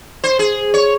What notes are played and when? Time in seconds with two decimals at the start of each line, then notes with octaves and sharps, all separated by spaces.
0.24 C5
0.39 G#4
0.74 C#5